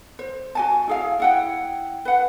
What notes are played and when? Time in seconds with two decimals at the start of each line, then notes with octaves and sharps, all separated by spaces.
0.19 C5
0.55 F#4 G#5 A5
0.87 E4 G#4 F5
1.20 E4 F#5 G5
2.05 B4 F#5